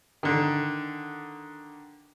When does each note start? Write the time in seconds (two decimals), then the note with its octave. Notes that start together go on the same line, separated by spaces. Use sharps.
0.23 D3 D#3